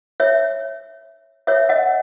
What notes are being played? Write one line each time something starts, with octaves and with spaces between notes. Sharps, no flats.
C#5 E5
C#5 E5
D#5 F#5